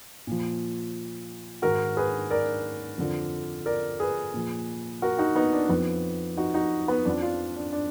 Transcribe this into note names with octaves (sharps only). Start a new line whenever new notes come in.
A#2 F3
G#2 D#3 F#4 A#4
G#4 B4
A#4 D5
F2 D3 F3
A#4 D5
G#4 B4
A#2 F3
F#4 A#4
D#4 F#4
B3 D#4
D4
F2 F3 B3
D#4 F#4
D#4 F#4
B3
F2 F3 D4
D4 F4
D4
D4